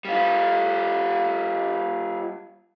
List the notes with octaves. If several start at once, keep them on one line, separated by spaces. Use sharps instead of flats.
G3 F4